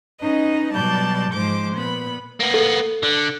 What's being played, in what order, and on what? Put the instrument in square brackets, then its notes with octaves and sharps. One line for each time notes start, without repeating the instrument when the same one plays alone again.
[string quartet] C#4 D#4 B4 D#5
B2 F#3 G3 D5 A5 G6
G#2 F3 G#3 C5 D6
A#2 B3 B5
[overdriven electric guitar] A#3 B3
[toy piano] A4
[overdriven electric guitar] D3